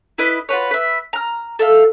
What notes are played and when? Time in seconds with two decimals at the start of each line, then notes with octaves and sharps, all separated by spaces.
0.18 E4 B4 D#5
0.49 F4 F#4 B4 C#5
0.71 B4 E5
1.13 A#5 F6
1.59 A4 E5 F5